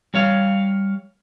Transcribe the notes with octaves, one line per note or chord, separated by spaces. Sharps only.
G3 C#5 F5